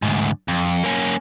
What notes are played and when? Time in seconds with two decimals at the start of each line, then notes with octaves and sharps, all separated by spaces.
0.02 D2 G#2
0.48 F2
0.83 A#3 C#4